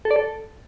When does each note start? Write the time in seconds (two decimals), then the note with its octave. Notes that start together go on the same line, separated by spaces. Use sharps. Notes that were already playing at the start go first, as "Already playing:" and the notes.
0.05 A4
0.11 D5
0.16 A4